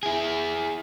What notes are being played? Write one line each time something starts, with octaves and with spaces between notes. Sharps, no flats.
E4 G#4